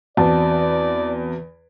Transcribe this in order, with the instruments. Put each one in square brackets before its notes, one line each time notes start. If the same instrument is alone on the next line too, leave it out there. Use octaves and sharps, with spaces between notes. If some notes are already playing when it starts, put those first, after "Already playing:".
[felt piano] E2 [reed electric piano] C4 F#4 A5 [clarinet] D5